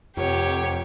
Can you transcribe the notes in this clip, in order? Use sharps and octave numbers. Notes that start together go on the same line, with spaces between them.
F1 F2 G4 C#5